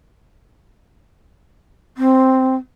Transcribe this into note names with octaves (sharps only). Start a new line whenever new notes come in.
C4